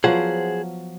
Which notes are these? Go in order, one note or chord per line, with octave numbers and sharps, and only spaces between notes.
F3 F#3 B3 G#4 C5 F#5